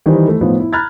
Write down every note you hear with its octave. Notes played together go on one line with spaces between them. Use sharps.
D#3 E3 G3 D#4 G4 C5
A3 E4
A2 F3 B3 D#4 F4
E4
A#5 B5 F6 F#6 G#6 A6